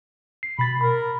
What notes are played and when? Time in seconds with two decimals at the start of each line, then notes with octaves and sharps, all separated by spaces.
0.43 C7
0.59 B2 B5 A6
0.81 A#4 B5